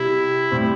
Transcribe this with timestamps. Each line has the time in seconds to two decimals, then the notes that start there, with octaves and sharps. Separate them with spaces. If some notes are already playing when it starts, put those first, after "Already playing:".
Already playing: C3 G3 E4
0.51 A2 G3 C4